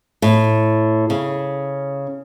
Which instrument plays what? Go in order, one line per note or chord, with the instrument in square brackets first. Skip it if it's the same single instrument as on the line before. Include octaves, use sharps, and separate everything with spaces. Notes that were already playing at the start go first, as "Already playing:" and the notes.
[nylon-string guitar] A2
C#3